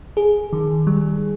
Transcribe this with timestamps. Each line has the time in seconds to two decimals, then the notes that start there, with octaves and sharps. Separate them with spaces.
0.17 G#4
0.53 D#3
0.87 G3